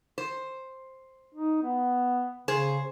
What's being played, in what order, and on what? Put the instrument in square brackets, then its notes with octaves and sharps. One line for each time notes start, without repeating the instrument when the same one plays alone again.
[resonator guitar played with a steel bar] C5
[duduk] D#4
B3
[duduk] C#3 [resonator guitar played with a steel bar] G#4 C5